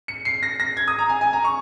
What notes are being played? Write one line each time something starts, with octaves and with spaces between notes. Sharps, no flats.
C#7
C7
A#6
A#6
G#6
D#6
A#5
G#5
G#5
A#5
C#6